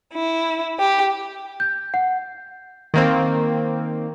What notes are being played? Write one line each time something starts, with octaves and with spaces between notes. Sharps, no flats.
E4
G4
G6
F#5
D#3 A#3 C4